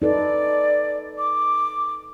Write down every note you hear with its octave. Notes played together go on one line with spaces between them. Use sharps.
D#4 A4 B4 D5
D6